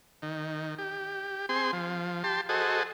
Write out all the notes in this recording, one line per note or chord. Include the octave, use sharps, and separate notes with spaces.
D#3
G4
C4 G#4 C6
F3
G4 A5 C6
F#4 G#4 A4 C5 D#5